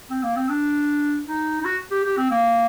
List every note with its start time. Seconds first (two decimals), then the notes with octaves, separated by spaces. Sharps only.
0.10 C4
0.23 A#3
0.36 C4
0.49 D4
1.27 D#4
1.61 D#4
1.65 F#4
1.91 G4
2.04 G4
2.17 C4
2.31 A#3